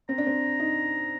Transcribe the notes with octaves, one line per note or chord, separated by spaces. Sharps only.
C4 A#5
D4
C4
D#4